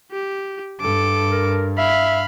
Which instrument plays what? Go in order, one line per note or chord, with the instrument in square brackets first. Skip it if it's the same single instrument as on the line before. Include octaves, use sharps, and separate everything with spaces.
[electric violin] G4
[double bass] G2 [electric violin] A4 D6
[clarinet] A#4
[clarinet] E5 [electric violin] F5 B5